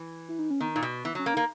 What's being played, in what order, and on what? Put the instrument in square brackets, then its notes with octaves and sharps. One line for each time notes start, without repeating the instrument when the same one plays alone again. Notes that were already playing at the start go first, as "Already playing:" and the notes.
Already playing: [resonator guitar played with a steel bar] E3
[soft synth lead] E4
D#4
C#4
[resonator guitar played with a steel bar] D#3 [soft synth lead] B3
[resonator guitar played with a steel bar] A#2 [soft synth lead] D#4
[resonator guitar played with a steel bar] B2
[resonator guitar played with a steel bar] E3 [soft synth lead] B3
[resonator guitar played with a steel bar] F#3 [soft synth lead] C#4
[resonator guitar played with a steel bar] A#3 [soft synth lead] C#4
[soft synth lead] D#4
[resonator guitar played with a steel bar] A#3